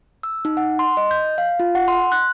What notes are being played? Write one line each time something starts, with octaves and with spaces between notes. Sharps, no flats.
E6
D#4
F#5
C6
D#5
G6
F5
F4
F#5
C6
F#6